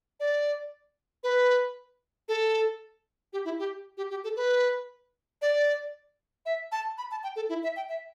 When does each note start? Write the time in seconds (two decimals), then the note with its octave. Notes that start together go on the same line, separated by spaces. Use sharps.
0.20 D5
1.23 B4
2.28 A4
3.33 G4
3.45 E4
3.59 G4
3.97 G4
4.10 G4
4.24 A4
4.36 B4
5.42 D5
6.46 E5
6.72 A5
6.98 B5
7.11 A5
7.23 G5
7.36 A4
7.49 E4
7.63 E5
7.76 G5
7.89 E5